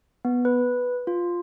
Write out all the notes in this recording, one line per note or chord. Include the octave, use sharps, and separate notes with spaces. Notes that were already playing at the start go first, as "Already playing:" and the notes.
B3
B4
F4